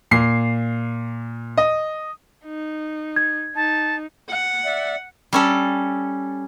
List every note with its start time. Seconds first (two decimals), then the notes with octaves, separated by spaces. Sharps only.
0.11 A#2 C7
1.58 D#5
2.45 D#4
3.16 G#6
3.56 D#4 A5
4.30 F#5
4.65 D5 E5
5.33 G3 C#4 A4